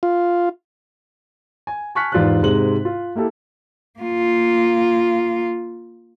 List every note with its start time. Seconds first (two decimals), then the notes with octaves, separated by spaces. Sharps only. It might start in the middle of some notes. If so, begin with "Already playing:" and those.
0.03 F4
1.67 G#5
1.95 G#5 A5 C#6 F6 F#6 B6
2.12 E2 G#2 F4 G4 D5 F#6
2.42 G#2 C3 G#3 C4 F#7
2.85 F4
3.15 A#3 E4 G4 A4
4.00 A#3 F4